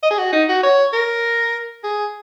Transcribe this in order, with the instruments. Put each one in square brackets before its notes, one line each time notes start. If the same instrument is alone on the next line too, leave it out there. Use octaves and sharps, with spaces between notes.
[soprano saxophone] D#5
G#4
F#4
D#4
F#4
C#5
A#4
G#4